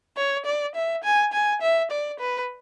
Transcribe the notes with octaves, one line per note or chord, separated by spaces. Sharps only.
C#5
D5
E5
G#5
G#5
E5
D5
B4